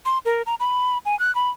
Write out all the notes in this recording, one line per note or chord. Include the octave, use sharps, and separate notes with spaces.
C6
A#4
A#5
B5
G#5
F#6
B5